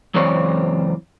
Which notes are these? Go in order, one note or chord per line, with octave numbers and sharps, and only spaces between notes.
C#2 F#2 E3 C4 C#5 D5